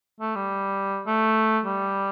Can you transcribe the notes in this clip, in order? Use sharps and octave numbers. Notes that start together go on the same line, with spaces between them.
A3
G3
A3
G3